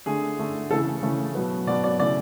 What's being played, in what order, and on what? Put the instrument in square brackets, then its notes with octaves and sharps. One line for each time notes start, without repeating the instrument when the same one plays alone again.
[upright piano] D3 A3 G#4
D3 A3
C#3 E3 A3 A4
C#3 E3 A3
B2 F#3 B3
B2 F#3 B3 D5
D5
C#3 E3 A3 D5